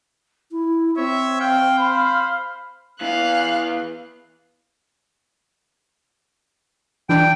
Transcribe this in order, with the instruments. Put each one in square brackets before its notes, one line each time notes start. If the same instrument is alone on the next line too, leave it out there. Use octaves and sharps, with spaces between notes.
[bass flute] E4
[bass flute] C4 [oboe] C#5 [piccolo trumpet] E5
[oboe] F5 [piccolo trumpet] G5
[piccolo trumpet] C5 [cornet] B5
[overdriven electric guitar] E3 B3 [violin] F5 F#6
[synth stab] E3 D4 [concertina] G5